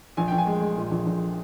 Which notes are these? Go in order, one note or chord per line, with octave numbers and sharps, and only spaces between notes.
A#1 G#5
A#1 G5
G#5
G#3
G#3
A#2
A#1
A#1